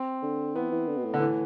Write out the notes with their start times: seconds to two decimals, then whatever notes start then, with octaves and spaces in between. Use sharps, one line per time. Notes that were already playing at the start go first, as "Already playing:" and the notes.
Already playing: C4
0.22 D3
0.55 E3 B3
0.71 E3
0.88 D3
0.97 B2
1.04 A2
1.14 D3
1.20 E3